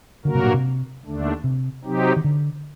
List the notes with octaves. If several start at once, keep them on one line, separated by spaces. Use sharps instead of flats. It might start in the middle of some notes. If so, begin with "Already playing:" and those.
G2 D3 F#3 A#3 F#4 A#4
C3
A#2
C3
D#2 D3 A3 D4
C3
C3 F#3 C4 D#4 G4
D#3
D3